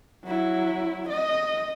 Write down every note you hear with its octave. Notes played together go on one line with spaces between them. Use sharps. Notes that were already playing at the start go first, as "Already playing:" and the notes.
F#3 E4
D#5